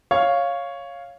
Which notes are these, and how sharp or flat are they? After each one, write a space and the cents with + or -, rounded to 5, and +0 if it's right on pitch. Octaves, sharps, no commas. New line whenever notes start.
C#5 +0 F5 +0